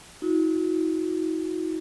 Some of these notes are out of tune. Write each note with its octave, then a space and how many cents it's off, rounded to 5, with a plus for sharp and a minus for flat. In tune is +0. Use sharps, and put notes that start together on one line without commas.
D#4 +45 F#4 -30